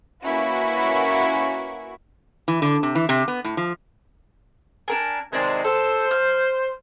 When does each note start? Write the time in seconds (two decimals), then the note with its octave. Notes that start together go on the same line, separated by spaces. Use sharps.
0.22 A#3 C#4 E4 F#4 B4
2.48 E3
2.62 D3
2.83 C3
2.95 E3
3.09 C3
3.28 B3
3.44 A2
3.57 F3
4.88 D4 A#4 G#5
5.33 C3 D#3 G#3 D4 C5 G#5
5.64 A4 C5
6.11 F6